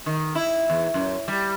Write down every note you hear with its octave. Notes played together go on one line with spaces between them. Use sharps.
D#3
E4
E2
F#2
G3